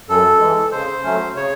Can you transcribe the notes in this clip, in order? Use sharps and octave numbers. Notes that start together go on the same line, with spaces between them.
F#2 A4
E3 G#3
C#3 C5
F#3 A3 C#4
C#3 C#5